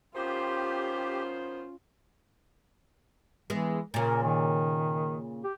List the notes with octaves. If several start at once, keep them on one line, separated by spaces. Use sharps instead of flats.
D#3 B3 C#4 F4 G4 C5
E3 G#3 B3
A#2 C#3 A#4
D#3
G4